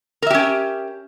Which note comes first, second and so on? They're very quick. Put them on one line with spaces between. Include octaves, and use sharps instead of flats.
A#4 E5 G4 C#4